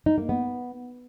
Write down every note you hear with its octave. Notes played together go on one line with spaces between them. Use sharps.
D#4
A#3
B3